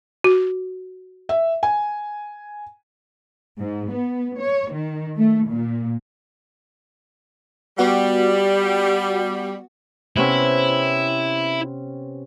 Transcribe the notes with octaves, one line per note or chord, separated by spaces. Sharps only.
F#4
E5
G#5
G#2
B3
C#5
D#3
A3
A#2
G3 B3 F#4 F#5
C3 B3 C#4 E4